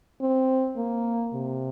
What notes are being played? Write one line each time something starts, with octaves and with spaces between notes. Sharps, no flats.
C4
A#3
C3